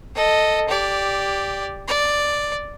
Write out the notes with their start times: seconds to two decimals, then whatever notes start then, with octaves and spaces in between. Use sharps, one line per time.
0.15 A4 D#5
0.69 G4 D5
1.88 D5